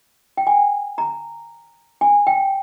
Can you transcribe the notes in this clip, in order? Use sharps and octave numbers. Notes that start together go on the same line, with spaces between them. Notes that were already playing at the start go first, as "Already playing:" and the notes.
G5
G#5
A#5
G#5
G5